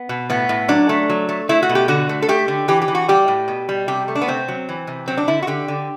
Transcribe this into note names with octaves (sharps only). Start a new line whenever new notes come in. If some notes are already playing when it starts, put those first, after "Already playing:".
Already playing: B3
B2
A2 B3
A2
F#3 D4
A3
F#3
A3
A3 E4
F#4
B2
G4
D3 F#4
A3
A4
A3 G4
D3
E3 G4
G4
E3
F#4
G3 G4
A2
B2
G3
C3 G4
A3
D4
B3
C3 C4
F#3
E3
C3
F#3 C4
D4
D3 E4
F#4
D3 G4
D3